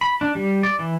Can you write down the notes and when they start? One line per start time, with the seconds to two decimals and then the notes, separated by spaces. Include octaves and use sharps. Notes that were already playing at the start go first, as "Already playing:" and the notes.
0.01 B5
0.21 D4
0.35 G3
0.63 D5
0.79 E3